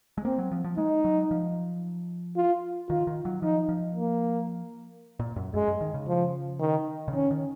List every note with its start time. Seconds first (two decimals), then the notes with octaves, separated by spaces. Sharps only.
0.18 G#3
0.24 A#3 C4
0.38 F#3
0.52 F3
0.64 F3
0.77 G#3 D#4
1.05 F#3
1.31 F3
2.36 F4
2.89 D#3 F4
3.07 D#3
3.25 F#3
3.42 F3 D#4
3.69 F3
3.95 A#3
5.20 A#2
5.36 F#2
5.54 F#2 G#3
5.68 F#2
5.81 D#3
5.94 C#3
6.08 F3
6.60 D#3
7.08 C#3
7.13 D#3 C#4
7.31 D#3